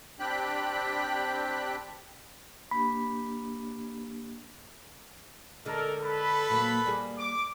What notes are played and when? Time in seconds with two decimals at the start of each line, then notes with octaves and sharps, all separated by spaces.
0.20 C4 D4 G4 G5 B5 F#6
2.71 A#3 D4 G4 B5
5.65 D3 G#3 A4 A#4
6.00 A4 B4 B5
6.49 A#2 F#3 A#3
6.86 G3 A#3 G#4
7.18 D6